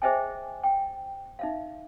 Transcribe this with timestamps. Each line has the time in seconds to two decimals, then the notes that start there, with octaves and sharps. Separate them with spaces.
0.02 G#4 C5 D#5 E5 G5 G#5
0.63 G5
1.39 D#4 E5 F5